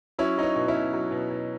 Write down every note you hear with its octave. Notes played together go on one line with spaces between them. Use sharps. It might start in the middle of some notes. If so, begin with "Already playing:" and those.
F#3 C#4 E4
F#3 D#4
C#4
B2
C#4 E4
B2
F#3
B2
B2